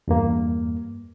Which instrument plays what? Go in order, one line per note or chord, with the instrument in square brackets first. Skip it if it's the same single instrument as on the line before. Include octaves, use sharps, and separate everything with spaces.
[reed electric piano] E2 G2 A#3